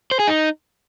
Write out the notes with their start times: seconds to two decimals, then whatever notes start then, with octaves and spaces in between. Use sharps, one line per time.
0.11 C5
0.19 G#4
0.27 D#4